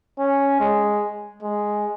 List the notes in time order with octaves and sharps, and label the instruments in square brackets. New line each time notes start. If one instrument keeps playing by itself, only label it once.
[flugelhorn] C#4
G#3
G#3